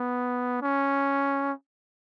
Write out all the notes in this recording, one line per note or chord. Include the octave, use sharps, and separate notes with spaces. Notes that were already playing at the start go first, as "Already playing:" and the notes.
Already playing: B3
C#4